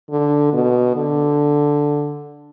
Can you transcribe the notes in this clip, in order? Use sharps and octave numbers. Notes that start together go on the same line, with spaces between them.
D3
B2
D3